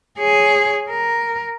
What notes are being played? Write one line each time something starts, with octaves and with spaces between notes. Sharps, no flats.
G#4 C#5
A#4